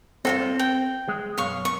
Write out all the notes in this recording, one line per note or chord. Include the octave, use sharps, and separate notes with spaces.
G2 C4 F4 F#4 A4
C4
G5
G#3
B1 F#2 F5 C#6
C#6